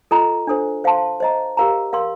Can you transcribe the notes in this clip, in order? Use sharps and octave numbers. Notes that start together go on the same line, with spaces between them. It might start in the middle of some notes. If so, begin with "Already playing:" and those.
F4 A4 D#5 A#5
D4 A4 C5
C5 F5 A5 C6
C5 D#5 A#5
G4 A#4 F5 A#5
A#4 F5 C6